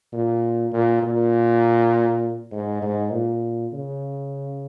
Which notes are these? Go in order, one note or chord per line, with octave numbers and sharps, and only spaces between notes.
A#2
A#2
A#2
G#2
G#2
A#2
C#3